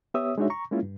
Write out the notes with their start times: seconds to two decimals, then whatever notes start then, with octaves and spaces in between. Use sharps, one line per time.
0.14 B3 G4 C#5 E5 D#6 E6
0.38 G#3 D4 D#4 F#4 C#5 E5
0.50 A#5 C#6
0.72 G#3 A#3 C#4 E4 F4
0.83 G2